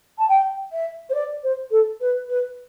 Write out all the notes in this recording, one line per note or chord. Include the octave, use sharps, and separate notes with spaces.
A5
G5
E5
C5
D5
C5
A4
B4
B4